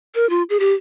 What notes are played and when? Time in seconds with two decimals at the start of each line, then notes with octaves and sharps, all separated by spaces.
0.15 A#4
0.30 F4
0.50 G#4
0.60 G4